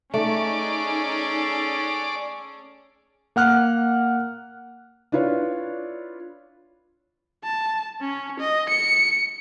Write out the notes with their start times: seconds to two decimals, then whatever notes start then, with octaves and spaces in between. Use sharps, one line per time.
0.14 A3 C#4 D#4 G#4 A4 D5
3.36 A#3 F#5 F6 F#6
5.12 D4 E4 F4 B4 C#5
7.44 A5
8.01 C#4
8.39 D#5
8.69 C#7